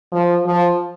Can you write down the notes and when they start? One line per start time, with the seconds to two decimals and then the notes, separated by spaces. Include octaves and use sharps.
0.12 F3
0.46 F3